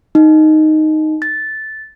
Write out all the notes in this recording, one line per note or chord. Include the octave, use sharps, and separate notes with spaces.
D#4
A6